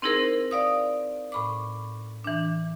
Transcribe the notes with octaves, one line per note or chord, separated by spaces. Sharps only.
C4 D#4 E4 G#4 A#4 C5
D5 F5 D#6
A2 B5 D6
E3 D4